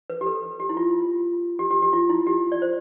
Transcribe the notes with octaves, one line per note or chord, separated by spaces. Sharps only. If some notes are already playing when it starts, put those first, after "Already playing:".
B4
G4
A4
G4
E4
F4
G4
G4
G4
F4
E4
G4
D5
C5